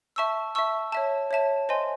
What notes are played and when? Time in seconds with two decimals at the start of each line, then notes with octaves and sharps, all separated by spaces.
0.16 E5 A5 C#6 E6
0.55 E5 A5 C#6 E6
0.92 C#5 E5 A5
1.31 C#5 E5 A5
1.69 C5 D#5 G#5 C6